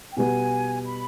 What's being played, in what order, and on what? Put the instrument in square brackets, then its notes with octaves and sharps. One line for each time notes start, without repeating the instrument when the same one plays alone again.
[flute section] G5
[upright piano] B2 G3 B3 [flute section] G#5
[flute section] B5